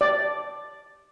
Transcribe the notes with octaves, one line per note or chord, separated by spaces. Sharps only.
D5